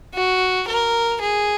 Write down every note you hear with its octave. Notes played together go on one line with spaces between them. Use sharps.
F#4
A#4
G#4